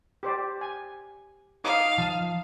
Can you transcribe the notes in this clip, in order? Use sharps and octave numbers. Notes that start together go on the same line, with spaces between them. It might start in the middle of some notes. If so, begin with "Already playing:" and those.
G4 C5 D5
G#5
D#4 F5 D6 D#6
F3 A5 D#6